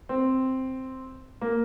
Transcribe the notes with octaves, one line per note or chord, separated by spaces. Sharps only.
C4
A#3